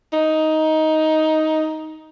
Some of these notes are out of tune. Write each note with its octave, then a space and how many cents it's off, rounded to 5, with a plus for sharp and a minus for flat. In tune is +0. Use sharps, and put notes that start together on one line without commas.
D#4 +10